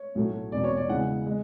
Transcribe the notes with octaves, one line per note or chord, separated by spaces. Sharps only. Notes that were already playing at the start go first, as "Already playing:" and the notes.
Already playing: C#5
B1 A2 F#3 A3
E1 E2 B2 D5
C#5
D5
E2 C#3 E3 G#3 F#5
G#3